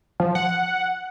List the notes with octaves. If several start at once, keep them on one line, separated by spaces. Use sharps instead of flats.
F3
F#5